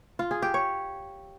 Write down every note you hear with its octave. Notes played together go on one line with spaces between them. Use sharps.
F4
G#4
G4
C#5